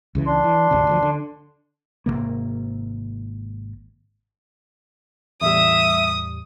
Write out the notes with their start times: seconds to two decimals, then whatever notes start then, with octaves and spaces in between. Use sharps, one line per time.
0.15 C#2 C#3 E3
0.27 D4 C6
0.44 E3
0.71 G#1 D2 C3
0.87 D2 D3 F3
1.02 D3
2.06 G#1 F#2 C3 A#3
5.42 E2 A2 G3 E5 D#6